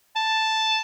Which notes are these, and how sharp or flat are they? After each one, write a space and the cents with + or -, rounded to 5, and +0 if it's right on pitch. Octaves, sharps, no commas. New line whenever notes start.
A5 +0